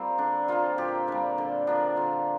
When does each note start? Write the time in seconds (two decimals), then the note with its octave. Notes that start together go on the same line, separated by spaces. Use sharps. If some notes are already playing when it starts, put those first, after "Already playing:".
Already playing: G3 A#3 C4 F4
0.18 D3 D4
0.48 F3 A#3 F4
0.78 A#2 G4
1.07 G3 A#3 D4
1.38 D3
1.67 F3 A#3 D4
1.97 D3 F4